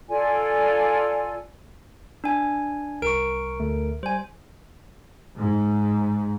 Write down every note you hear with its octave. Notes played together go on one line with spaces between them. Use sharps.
F4 A4 D5 G#5
D4 G#5
C2 A#4 C#6 D7
D2 A3
G3 C5 G#5
G#2